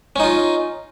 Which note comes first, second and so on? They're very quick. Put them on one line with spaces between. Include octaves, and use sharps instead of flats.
C#4 D#4 F4